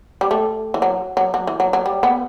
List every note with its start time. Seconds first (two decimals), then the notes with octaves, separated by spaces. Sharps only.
0.21 G3
0.31 A3
0.74 E3
0.82 F#3
1.17 F#3
1.34 F#3
1.47 E3
1.60 F#3
1.73 F#3
1.86 G3
2.03 B3